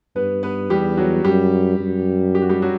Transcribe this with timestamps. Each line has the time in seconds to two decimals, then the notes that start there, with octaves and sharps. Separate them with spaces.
0.16 G2 B3 B4
0.43 B3 B4
0.70 E2 G3 G4
0.97 F#3 F#4
1.24 F#2 G3 G4
1.79 F#2
2.35 G4
2.42 F#4
2.49 G3 G4
2.62 F#3 F#4